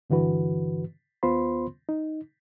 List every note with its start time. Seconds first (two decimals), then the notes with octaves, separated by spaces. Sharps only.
0.10 G2 D3 E3 F#4 B4
1.23 D#2 B3 F4 C5 B5 C6
1.89 D#4